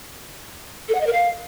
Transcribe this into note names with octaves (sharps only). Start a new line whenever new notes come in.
A4
F#5
D#5
A#4
F5